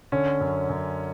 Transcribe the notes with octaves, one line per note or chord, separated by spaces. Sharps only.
D3 C#4
F#2
F#2